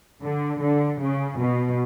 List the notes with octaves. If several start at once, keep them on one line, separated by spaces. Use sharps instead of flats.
D3
D3
C#3
B2